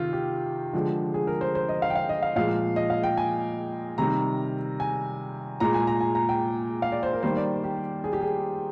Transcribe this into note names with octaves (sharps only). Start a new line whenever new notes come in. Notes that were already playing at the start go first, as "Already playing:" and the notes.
Already playing: C3 D#3 F4
G4
D3 F3 G#3
G#4
A#4
C5
C5
D#5
F5
G5
F5
D#5
F5
A#2 F3 G#3 F5
D#5
F5
G5
G#5
C3 D#3 G3 A#5
G#5
A#2 G#3 A#5
G#5
A#5
G#5
A#5
G5
F5
D5
C5
A#4
D#3 G3 A#3 C5
D5
G4
G#4
G4
G#4